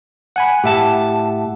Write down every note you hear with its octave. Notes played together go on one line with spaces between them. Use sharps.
F#5 G#5 B5
A2 G4 E5 F#5 A5